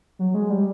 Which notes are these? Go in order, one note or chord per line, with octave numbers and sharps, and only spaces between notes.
F#3
G#3
G3